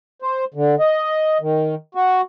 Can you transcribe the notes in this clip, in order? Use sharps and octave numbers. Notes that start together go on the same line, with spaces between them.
C5
D3
D#5
D#3
F#4